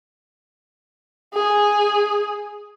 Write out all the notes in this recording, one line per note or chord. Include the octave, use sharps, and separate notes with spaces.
G#4